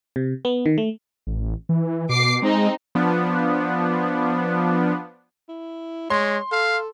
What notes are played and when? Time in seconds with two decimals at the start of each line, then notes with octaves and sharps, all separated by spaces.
0.16 C3
0.45 B3
0.66 D#3
0.78 A3
1.27 A1
1.69 E3
2.09 B2 D6 C7
2.42 G#3 C4 D#4
2.95 F3 B3 D4
5.49 E4
6.10 G#3 C#5 C6
6.52 A4 F5